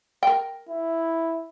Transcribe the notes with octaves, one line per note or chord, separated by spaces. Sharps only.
A#4 G5
E4